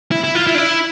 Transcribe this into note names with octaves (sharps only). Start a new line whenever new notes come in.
E4
E4
F4
E4
D4
E4